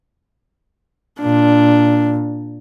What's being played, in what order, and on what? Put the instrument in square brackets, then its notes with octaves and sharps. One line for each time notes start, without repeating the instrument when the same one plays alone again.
[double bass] A#2 [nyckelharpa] D4